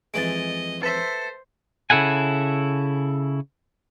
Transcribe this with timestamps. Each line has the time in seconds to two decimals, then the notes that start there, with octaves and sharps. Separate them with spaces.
0.14 F2 E3 G#3 D#5 A6 D7
0.83 A4 B4 C5 E5 B6
1.90 C#3 E4 A4 F#5 G#5